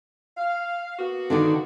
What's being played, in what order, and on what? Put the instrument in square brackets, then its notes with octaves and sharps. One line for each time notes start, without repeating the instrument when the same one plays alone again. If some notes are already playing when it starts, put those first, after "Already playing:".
[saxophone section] F5
A#3 B3 F#4
[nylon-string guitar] D3 D#3 D4